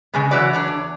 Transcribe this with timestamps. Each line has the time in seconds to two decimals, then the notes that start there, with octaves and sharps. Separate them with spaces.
0.14 C#3 G#3 B3
0.31 E3 F#3 B4 D5
0.53 D4 C#5 D5
0.68 E2